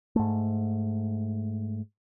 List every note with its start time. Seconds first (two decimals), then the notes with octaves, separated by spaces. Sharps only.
0.16 G#2 A3